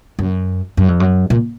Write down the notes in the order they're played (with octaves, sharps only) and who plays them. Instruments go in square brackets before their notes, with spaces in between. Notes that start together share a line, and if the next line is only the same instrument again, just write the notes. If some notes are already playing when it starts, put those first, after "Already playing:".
[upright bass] F#2
F#2
F2
F#2
A#2